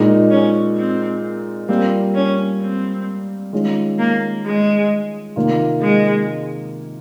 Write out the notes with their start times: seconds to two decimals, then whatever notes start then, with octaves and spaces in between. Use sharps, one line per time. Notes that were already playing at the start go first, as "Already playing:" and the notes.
Already playing: A#2 G#3 D#4
0.30 C#4
0.77 C4
1.69 G3 A#3 C4 F4
2.15 C#4
2.61 C4
3.52 D#3 G#3 C#4 F4
3.99 A#3
4.45 G#3
5.36 C3 D#3 A#3 F4
5.82 G#3